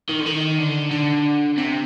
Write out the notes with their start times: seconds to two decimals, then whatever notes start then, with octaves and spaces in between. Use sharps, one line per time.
0.09 D#3
0.20 D3
0.26 D#3
0.58 D3
0.91 D3
1.57 C3